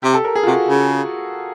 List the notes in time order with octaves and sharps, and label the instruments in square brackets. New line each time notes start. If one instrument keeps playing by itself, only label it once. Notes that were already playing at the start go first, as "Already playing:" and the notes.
[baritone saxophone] C3 [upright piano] G4
[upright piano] A4
A#4
G#4
F4
[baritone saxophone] C3 [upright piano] F#4
[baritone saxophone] C#3